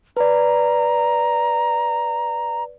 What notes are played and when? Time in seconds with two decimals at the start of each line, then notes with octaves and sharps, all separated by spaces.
0.17 B4 D5 A#5